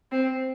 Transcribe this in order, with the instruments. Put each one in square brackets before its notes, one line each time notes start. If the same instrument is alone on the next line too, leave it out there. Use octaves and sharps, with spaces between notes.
[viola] C4